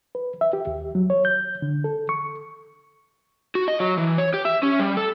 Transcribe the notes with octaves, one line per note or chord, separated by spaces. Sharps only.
B4
E5
G4
D#2
F#3
C#5
G6
D3
A4
C#6
F#4
D#5
F#3
E3
C#5
G4
E5
C#4
G3
A4